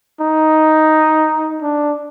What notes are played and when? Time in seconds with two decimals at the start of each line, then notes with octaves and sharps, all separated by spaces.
0.21 D#4
1.62 D4